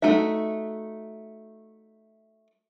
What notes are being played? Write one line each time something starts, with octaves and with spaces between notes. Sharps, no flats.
A3 D#4 F#4 E5